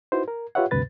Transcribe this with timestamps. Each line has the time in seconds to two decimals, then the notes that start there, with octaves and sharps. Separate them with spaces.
0.12 D#4 E4 F#4 B4 C5
0.28 A#4
0.55 F4 G4 B4 C#5 E5 F#5
0.71 D2 G2 C3 B4 A6